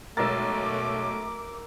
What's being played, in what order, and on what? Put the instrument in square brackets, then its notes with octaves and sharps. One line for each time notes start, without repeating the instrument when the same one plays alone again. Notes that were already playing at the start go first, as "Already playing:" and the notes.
[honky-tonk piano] B1 G#3 A6 [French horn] A3 [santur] A#4 E5 [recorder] D6